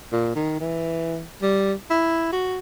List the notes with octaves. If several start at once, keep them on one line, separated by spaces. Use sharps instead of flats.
A#2
D#3
E3
G3
E4
F#4